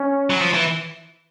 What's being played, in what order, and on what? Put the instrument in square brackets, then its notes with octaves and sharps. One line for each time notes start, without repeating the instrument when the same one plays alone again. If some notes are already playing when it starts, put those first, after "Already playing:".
Already playing: [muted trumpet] C#4
[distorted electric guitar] F#3
F3
E3